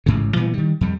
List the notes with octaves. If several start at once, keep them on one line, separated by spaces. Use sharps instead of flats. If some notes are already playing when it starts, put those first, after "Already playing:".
A1 G#2 C#3
A#2 E3 G3 B3
D#3 G3
F2 G3